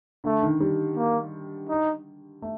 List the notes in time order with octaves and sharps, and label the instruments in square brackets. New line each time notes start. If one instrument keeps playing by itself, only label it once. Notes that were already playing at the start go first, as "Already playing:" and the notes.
[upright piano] D3 [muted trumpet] A3
[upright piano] D#3
G3
[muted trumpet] A#3
D#4
[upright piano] A3